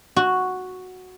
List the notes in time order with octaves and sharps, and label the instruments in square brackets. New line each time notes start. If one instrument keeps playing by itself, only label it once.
[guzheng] F#4